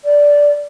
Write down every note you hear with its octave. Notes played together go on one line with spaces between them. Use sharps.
D5